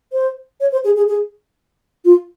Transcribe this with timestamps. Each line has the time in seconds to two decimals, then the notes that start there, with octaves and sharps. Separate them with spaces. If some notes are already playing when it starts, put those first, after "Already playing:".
0.12 C5
0.60 C#5
0.72 C5
0.84 G#4
0.96 G#4
1.08 G#4
2.05 F4